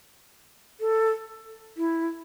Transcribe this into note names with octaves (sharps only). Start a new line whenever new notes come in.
A4
E4